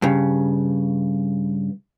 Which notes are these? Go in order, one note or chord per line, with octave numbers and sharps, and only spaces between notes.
G2 C#3